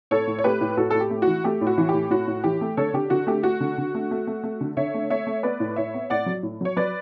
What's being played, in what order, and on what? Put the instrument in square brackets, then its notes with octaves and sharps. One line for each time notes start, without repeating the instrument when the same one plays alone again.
[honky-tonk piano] A2 A4 C#5
A2
C#5
A3 G4 B4
A2
A2 F#4 A4
A2 A4
G4
A3
F#4
E3
A3 G4
A2
F#4
E3
A2 G4
A2 F#4
A2
E3 G4
A3
D3 A4 C#5
D3 G4
D3 F#4
A3 G4
A3 F#4
D3
D3
A3
A3
A3
A3
D3
D3 C#5 E5
A3
A3 C#5 E5
A3
B3 B4 D5
A2
A2 C#5 E5
B3
A2 D5 F#5
F#3
A2
F#3 C#5
F#3 B4 D5